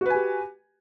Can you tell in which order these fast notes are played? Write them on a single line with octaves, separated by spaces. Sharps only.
F#4 B4 G#5 G4